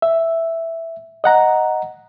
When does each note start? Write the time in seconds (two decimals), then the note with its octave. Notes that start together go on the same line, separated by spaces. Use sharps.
0.02 E5
1.24 D#5 F#5 A#5